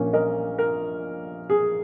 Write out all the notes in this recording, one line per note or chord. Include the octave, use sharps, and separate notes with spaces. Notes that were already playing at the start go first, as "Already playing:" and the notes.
Already playing: A#1 A#2 A#3 C#4
A#4 D#5
A#4
G#4